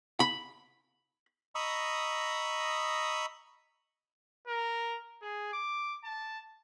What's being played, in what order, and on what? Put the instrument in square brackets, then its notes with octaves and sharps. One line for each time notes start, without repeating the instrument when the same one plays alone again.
[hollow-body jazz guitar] B5
[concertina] D#5 A#5 B5 C#6 D#6 E6
[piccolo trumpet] A#4
G#4
D6
A5